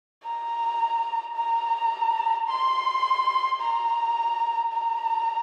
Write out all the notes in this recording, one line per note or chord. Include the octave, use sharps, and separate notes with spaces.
A#5
A#5
C6
A#5
A#5